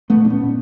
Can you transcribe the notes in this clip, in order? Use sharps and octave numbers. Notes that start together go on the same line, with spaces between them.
A3 B3
A#2
D4
B3 C#4
A#2